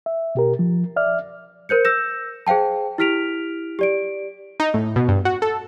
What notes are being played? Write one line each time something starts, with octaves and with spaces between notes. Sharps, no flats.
E5
B2 G4 A#4
F3
D5 E5 F6
A#4 C5 G6 C#7
E6 G6 A#6 E7
G#4 C5 F5 G5 A5
E4 G4 F6 B6 D7 F7
G4 D5 D7
D#4
A2
B2
G2
F#4
A4